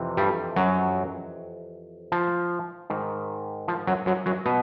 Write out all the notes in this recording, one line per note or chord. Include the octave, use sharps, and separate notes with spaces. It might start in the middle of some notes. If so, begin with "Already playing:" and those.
Already playing: F2 C3 E3
G2 G3
F#2 F#3
F3
G#2 D#3
F3
F#2 F#3
F#2 F#3
F#2 F#3
B2 B3